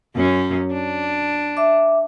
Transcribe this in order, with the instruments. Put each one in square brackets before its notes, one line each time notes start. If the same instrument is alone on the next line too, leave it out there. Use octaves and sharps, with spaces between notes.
[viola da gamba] F#2 C#4
D4
[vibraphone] E5 D6